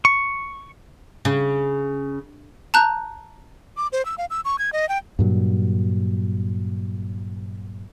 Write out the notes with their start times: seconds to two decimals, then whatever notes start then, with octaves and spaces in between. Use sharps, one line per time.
0.05 C#6
1.25 C#3
2.74 A5 A#5 F#6 G6
3.77 D6
3.92 C5
4.05 E6
4.18 F5
4.30 E6
4.45 C#6
4.59 G#6
4.73 D#5
4.89 G5
5.19 G2 A#2 F#3